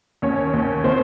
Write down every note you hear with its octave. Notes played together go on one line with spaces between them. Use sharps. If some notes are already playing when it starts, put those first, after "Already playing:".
D#2 C#4 C#5
D#2 C#4 C#5
D#3 C4 C5